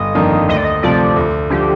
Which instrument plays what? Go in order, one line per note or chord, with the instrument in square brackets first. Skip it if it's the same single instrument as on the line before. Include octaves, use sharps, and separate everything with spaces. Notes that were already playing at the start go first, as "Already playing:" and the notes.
Already playing: [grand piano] G1 [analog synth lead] D#5
[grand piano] F2 D#3 A#3 D4
[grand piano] D2 [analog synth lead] D#5
[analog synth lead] D5
D#5
[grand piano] C3 F3 A3 [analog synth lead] D5
[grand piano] D2
[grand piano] D3 F3 [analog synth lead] G4